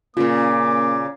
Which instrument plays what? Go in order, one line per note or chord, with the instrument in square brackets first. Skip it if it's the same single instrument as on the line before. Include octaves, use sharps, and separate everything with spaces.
[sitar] A#2 C#3 [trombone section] A#3 [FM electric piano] F4 [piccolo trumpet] D6